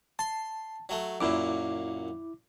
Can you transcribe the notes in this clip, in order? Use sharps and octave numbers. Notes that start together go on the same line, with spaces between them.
A5 C6
F#3 A3
F#2 A#2 E4 D6